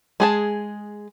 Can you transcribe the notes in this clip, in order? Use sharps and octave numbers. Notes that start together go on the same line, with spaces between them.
G#3 G#4 A5